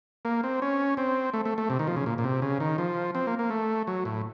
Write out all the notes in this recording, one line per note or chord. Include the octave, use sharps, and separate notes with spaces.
A#3
C4
C#4
C4
A3
A3
A3
C3
D#3
F3
C#3
A#2
A#2
C3
C#3
D#3
F3
C4
A#3
A#3
A3
F#3
A2